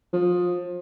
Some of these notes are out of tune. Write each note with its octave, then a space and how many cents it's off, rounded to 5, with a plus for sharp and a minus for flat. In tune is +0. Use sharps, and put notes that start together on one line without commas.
F3 +25